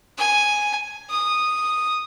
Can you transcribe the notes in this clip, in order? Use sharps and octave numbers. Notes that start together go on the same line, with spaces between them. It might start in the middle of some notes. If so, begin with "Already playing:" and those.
G#5
D#6